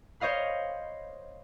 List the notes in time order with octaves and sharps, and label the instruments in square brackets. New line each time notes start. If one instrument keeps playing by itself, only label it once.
[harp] C5 C#5 D#5 F5 B5